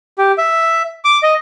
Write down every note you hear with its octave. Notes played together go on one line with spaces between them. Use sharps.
G4
E5
D6
D#5